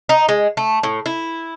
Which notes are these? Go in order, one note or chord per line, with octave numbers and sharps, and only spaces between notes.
D#4
G#3
A3
A2
E4